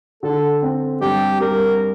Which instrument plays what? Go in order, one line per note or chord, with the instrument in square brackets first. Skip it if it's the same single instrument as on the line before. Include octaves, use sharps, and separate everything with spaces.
[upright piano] D3 [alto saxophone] A4
[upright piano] C4
[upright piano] G2 [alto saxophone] G4
[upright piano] G3 [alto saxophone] A#4